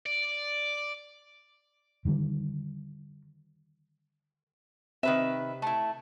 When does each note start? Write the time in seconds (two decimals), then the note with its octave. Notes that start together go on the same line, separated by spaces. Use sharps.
0.06 D5
2.05 D3 D#3 G3
5.03 C3 D#3 B4 E5
5.62 A3 E4